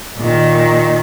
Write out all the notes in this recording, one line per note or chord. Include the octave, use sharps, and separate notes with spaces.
A#2 D#3